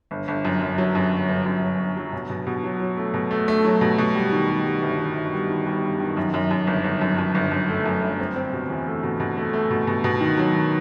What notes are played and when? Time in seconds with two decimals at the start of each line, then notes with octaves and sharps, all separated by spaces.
0.11 G1
0.28 G1
0.45 F#2
0.62 F#2
0.78 F#3
0.95 F#2
1.12 G1
1.29 G1
1.46 F#2
1.62 F#3
1.79 G1
1.97 F#3
2.13 B2
2.30 B2
2.47 B2
2.64 F#3
2.80 F#3
2.97 A3
3.14 B2
3.31 A3
3.48 A3
3.65 F#3
3.81 B2
3.98 B2
4.15 G3
4.32 D#3
4.49 G3
4.65 G3
4.82 G1
4.99 D#3
5.16 G1
5.33 G3
5.50 D#3
5.67 G3
5.83 G2
6.00 D#3
6.17 F#2
6.34 F#2
6.51 F#2
6.67 G1
6.84 G1
7.01 F#2
7.18 F#2
7.35 G1
7.52 F#2
7.68 A3
7.85 F#2
8.02 G1
8.19 C4
8.36 C4
8.53 B2
8.70 E2
8.86 A3
9.03 B2
9.20 B2
9.37 A3
9.53 A3
9.71 B2
9.87 B2
10.04 B2
10.21 D#3
10.38 F#3
10.55 D#3